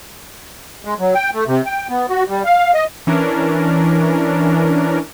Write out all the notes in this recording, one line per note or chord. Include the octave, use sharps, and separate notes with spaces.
G#3
F#3
G5
A3
C3
G5
B3
F#4
G3
F5
D#5
E3 C#4 D4 A#4